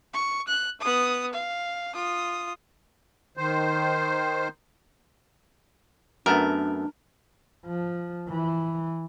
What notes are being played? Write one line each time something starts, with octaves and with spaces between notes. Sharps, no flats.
C#6
F#6
B3 D#6
F5
F4 D#6
D#3 C5
F#2 A3 B3 D4 A#4
F3
E3